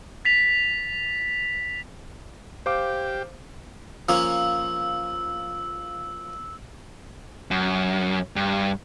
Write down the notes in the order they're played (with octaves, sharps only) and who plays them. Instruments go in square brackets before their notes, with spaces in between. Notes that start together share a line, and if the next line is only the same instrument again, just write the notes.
[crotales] A6 B6 F7
[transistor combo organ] G4 [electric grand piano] C5 F5 D6
[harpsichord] F3 A#3 C#4 [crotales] E6
[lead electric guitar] F#2
G2